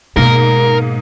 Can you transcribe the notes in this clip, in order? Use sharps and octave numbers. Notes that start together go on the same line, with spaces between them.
G#2 B2 A#3 A#4